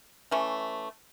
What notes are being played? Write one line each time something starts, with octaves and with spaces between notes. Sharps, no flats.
E3 A3 C#4